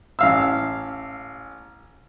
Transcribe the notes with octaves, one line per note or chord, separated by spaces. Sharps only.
A1 F5 E6